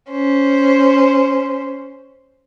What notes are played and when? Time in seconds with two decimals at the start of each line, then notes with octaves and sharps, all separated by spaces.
0.10 C#4 C5